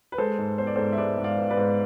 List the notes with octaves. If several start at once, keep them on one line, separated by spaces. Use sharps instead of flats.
B4
G#3 A4 C5
G#2
B3 C5
D5
G#2 A4 C5
E5
G#3 B4 D5
G#2
D5 F5
B3
B4 D5
G#2